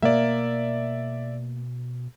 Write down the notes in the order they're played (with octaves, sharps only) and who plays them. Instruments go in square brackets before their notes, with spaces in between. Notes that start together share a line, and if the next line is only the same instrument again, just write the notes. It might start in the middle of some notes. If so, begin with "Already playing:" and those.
[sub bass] B2 [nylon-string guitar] A#3 [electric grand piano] D5 E5